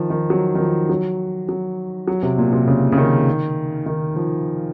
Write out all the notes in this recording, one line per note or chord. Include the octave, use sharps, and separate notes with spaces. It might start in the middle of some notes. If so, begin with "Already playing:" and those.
Already playing: D#3 F3
D#3
F#3
D#3
F3
F#3
F#3
F#3
C3
A#2
C3
C#3
C#3
D#3
D#3
F3